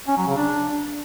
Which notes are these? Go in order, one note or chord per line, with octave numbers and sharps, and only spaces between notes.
C#4
F#3
C#3
D4